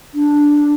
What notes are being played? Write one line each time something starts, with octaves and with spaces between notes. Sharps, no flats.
D4